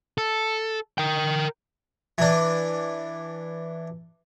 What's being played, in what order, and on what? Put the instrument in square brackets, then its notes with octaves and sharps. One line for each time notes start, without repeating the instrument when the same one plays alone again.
[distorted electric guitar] A4
A#4 G5
[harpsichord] E3 D4